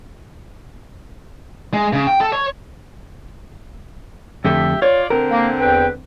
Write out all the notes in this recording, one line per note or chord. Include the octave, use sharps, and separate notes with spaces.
G#3
C#3
G5
A4
C#5
F2 D3 A3 G4 E5
F4 C#5 D5
D3 C4 A#4
A#3
E2 B4 G5